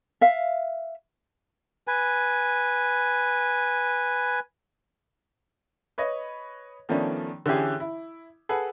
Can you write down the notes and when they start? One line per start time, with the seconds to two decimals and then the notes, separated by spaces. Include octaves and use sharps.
0.21 E5 F5
1.88 B4 G#5
5.98 B4 C#5 D#5
6.89 D#3 F3 A3 B3 C#4 D4
7.46 D3 E3 C#4 G4 G#4
7.80 E4
8.49 G#4 A4 B4 F#5